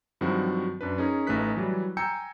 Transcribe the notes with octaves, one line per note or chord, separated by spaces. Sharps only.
G2 D#3 F3 F#3 C4 F#4
F#2 D4 B4
C#4 D#4 G#4 A#4
A1 A3 D#4 B4 F#6 B6
E3 F#3 G3
G5 G#5 A#5 E6 G6 C#7